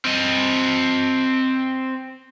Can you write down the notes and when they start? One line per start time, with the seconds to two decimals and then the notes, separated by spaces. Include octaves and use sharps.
0.05 C4 D#5